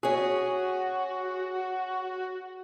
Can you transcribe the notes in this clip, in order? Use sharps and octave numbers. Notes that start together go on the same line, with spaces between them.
C#4 F#4 G#4